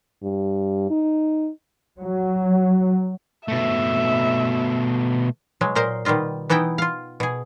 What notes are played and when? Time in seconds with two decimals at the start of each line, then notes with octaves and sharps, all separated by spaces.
0.23 G2
0.90 D#4
1.99 F#3
3.48 B2 A3 E5
5.61 B2 F#3 G#3
5.75 A#2 A#4 C5 D#5
6.05 B2 D#3 G3 F4 D#5
6.50 E3 B3 D#4 E4 G5
6.78 F4 F5
7.20 B2 G#4